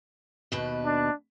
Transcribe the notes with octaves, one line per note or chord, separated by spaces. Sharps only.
D#2 B2 B4
D4